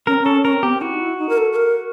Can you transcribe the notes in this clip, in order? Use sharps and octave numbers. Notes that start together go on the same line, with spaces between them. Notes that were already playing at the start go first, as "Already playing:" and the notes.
C#4 A#4
C4
C#4 A4
C#4 A#4
C4
B3 G4
C4
E4 F#4
D#4
E4
D#4
A#4
A4
A4
A#4